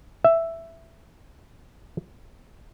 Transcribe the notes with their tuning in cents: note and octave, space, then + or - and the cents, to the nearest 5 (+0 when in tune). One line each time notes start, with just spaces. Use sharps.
E5 +5